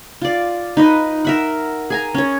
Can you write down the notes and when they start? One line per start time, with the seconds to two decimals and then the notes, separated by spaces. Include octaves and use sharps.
0.22 F4 D5
0.77 D#4 B4 D#5
1.25 A#4 E5 F#5
1.90 G#4 G#5 A#5
2.15 C#4 C#5